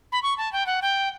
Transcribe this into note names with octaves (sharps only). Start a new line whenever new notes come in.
B5
C#6
A5
G5
F#5
G5